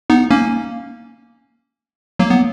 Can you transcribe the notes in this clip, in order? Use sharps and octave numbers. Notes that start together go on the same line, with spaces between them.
B3 D#4
A#3 C#4
F#3 A#3
B3